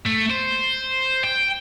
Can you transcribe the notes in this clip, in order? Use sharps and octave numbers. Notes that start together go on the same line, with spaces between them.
A3
C5
G5